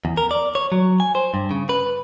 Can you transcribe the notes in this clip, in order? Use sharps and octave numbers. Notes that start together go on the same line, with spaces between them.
E2
A#4
D5
C#5
F#3
G#5
C5
G2
C#3
B4